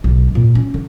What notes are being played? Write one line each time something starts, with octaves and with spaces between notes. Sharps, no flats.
B1
A#2
C#4
D3